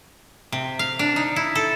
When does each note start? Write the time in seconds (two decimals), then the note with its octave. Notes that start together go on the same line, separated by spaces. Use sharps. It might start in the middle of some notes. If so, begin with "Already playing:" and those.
0.52 C3
0.79 F5
0.99 D4
1.16 D#4
1.36 E4
1.55 A4